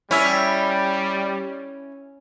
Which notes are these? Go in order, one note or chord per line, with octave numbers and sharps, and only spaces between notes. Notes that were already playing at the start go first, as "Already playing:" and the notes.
G3 C#4 E4 E5